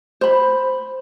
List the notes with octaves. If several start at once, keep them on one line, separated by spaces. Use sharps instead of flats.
C5 B5